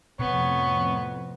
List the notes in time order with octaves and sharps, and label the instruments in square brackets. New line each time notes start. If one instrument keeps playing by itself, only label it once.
[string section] F2 A2 [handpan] C3 [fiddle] B3 [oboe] C#5